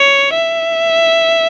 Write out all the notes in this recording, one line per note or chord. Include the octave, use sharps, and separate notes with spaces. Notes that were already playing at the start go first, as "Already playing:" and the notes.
Already playing: C#5
E5